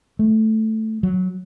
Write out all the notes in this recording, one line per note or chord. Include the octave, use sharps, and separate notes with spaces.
A3
F#3